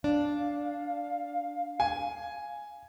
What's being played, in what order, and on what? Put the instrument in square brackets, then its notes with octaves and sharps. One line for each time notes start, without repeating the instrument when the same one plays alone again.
[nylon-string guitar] D4 [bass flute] F5
[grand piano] G#5